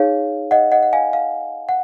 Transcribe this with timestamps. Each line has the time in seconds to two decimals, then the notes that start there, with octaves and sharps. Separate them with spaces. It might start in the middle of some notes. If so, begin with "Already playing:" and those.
Already playing: D#4 G#4 C#5 F5
0.51 D#5 F#5
0.72 D#5 F#5
0.83 F#5
0.93 F5 G#5
1.13 F5
1.69 F#5